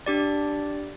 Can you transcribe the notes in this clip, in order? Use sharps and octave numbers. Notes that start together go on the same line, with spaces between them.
D4 G4 D5